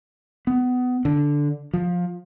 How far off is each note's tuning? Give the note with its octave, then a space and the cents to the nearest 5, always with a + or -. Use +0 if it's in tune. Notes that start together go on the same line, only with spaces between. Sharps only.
B3 +20
D3 -5
F3 +20